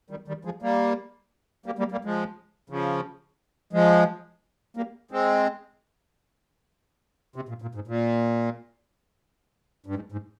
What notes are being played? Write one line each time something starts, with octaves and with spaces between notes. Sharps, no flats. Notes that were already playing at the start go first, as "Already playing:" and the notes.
D#3 G3
D#3 G3
F3 G#3
G3 A#3
G3 A#3
G3 A#3
G3 A#3
F3 G#3
C#3 F3
F3 G#3
G3 A#3
G#3 C4
C3
A#2
A#2
G#2
A#2
G2
G#2
G#2